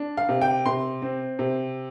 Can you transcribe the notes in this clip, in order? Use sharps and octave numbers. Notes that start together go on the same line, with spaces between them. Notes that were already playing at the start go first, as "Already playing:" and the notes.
Already playing: D4
F5
C3
G5
C3 C6
C4
C3